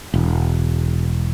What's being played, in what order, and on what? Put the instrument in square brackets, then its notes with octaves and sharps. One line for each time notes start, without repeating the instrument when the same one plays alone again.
[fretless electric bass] E1